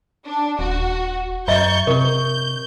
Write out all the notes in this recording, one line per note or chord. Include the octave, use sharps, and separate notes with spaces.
D4
D#1 F#4
F#2 D#5 E5 A#5 C#6 G6
C3 A#4 C#6 G6